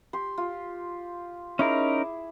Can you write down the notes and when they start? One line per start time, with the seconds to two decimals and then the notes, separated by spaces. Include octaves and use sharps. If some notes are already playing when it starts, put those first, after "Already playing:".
0.13 G4 C6
0.38 F4
1.59 C#4 D#4 E4 G#4 A#4 D6